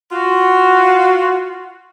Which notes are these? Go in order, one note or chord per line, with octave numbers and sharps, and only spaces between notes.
F4 F#4